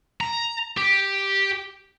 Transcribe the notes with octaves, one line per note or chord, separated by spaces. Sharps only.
A#5
G4